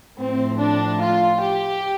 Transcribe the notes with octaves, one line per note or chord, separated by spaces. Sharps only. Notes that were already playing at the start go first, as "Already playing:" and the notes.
A2 F3 C4
D4
F4
G4